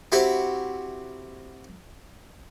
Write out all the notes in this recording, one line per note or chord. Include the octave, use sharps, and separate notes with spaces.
C4 E4 F#4 G4